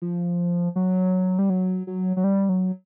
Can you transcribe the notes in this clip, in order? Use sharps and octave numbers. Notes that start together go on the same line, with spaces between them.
F3
F#3
G3
F#3
F#3
F#3
G3
F#3